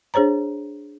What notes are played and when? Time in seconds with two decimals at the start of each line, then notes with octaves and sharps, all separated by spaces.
0.14 D4 G#4 C5 C#5 A#5